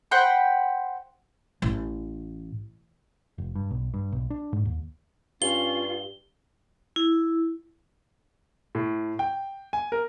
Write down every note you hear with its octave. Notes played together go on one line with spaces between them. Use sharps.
C5 F#5 G5 B5
A1
F1
G2
B1
G2
B1
D4
G#2
D#2
G2 C#4 F4 G7
E4
A2
G5
G#5
A#4